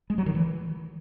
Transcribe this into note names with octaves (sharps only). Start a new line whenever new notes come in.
G#3
F#3
D#3
E3